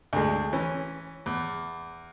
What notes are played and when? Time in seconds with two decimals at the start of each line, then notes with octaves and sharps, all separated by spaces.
0.13 D2 G#3
0.53 E3 C#4
1.26 E2